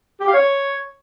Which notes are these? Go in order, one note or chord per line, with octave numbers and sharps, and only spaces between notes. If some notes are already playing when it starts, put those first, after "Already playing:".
G4
F5
C#5